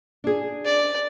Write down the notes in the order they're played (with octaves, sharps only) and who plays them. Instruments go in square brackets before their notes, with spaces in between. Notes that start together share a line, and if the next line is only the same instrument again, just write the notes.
[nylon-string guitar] D4 G#4
[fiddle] D5